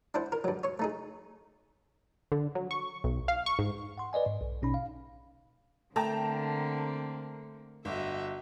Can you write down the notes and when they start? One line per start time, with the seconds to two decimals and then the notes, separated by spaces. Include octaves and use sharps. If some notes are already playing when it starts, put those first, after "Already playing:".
0.14 D4 E4 C5 F#5
0.32 A#4
0.44 G2 F#3
0.64 C#5 C#6
0.79 A3 D#4 G#4
2.32 D3
2.55 F#3
2.71 C#6
3.04 B1
3.28 F5
3.46 C#6
3.59 G#2
3.98 F#5 C6
4.13 B4 D5 D#5 G#5
4.26 G#2
4.41 B1
4.62 A#1 B2 C#4 D#4 B5
4.74 F5
5.96 D3 A3 A#3 C4 G5 A5 A#5
7.85 G1 F#4 D#5 E5